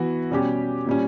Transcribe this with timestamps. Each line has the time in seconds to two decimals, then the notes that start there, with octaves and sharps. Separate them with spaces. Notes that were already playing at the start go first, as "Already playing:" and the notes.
Already playing: E3 B3 F#4
0.31 B2 G3 C#4 G4
0.86 A#2 G3 C#4